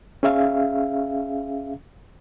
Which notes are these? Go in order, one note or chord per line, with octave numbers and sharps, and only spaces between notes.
C#4 G#4 E5 F5